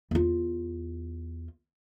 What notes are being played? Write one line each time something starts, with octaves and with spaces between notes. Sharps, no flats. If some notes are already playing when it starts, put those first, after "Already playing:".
E2 F4